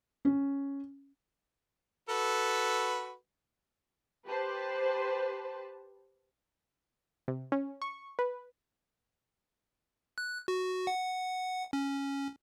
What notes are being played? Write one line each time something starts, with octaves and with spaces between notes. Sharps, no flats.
C#4
F#4 A4 B4
G4 B4 C5 A5
C3
C#4
C#6
B4
F#6
F#4
F#5
C#4